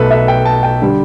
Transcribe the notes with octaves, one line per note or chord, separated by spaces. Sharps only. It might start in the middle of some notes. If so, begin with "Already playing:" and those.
Already playing: B1 B2 A3 A4 B4
E5
G5
A5
G5
D3 G3